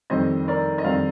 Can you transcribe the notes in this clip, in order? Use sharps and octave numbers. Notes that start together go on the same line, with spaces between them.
F2 D#3 G3 C4 C5 D#5
A#4 D5
D#5
F2 D#3 G3 C4 D5 F5